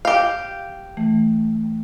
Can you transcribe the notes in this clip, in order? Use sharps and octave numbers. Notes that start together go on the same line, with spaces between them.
G4 F5
E3 A3